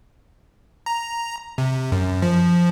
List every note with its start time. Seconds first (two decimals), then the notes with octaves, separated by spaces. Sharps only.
0.86 A#5
1.58 C3
1.92 F#2
2.22 F3